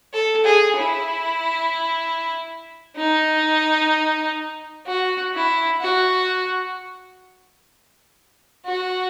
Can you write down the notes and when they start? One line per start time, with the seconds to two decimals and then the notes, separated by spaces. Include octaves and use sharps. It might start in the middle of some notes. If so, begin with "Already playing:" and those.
0.13 A4
0.45 G#4
0.77 E4
2.97 D#4
4.87 F#4
5.34 E4
5.81 F#4
8.65 F#4